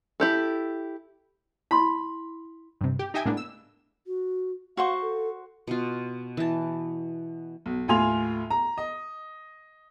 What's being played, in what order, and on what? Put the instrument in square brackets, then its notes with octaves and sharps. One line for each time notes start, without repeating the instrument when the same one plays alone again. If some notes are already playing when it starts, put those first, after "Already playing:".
[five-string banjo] E4 G4 A4
[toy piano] E4 C6 [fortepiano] B5
[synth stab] G2 C3
G4
D#4 G4 D#5 E5 G5 G#5
A2 G#3 A#3 B3 D4
E6
[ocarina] F#4
[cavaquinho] F#4 C5 C#6 [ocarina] F5
[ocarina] A4
[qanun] B2 F4
E3 A5
[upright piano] B1
D#2 A2 F4 G#5 C6 F7
A#5
D#5